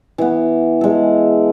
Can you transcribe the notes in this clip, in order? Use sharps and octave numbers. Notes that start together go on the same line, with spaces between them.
E3 B3
G#3 A4